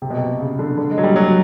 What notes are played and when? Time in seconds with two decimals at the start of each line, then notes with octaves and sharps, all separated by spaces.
0.02 C3
0.10 B2
0.17 C3
0.40 C#3
0.59 D3
0.78 D3
0.91 G#3
0.98 F#3
1.03 G3
1.16 F#3